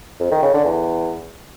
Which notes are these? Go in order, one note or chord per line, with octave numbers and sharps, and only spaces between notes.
F2
D#3
C#3
D3
E2